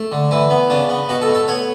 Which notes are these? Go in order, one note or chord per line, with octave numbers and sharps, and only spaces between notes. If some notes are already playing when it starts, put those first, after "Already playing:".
Already playing: A3
D3
E3 E4
B3
C#3 D4
B3
B2 F#4
A4
A3
A4
B3 C#5